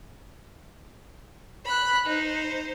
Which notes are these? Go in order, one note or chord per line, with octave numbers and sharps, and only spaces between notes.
B5 F#6
D#4 C5